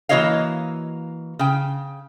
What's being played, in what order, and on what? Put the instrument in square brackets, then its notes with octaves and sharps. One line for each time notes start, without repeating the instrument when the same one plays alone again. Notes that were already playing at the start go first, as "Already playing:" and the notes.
[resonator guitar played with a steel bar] E3 A#3 F#4 C#5 D#5 F5
C#3 G5